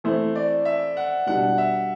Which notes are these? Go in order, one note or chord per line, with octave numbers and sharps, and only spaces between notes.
E3 A3 C4 E4 C5
D5
E5
F#5
B2 G3 D4 F#5
E5